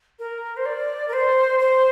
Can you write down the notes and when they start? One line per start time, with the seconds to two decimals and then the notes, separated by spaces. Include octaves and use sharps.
0.19 A#4
0.57 C5
0.66 D5
1.08 A#4
1.13 C5
1.59 C5